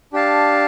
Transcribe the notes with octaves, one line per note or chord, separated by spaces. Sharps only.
D4 G4 F5 A5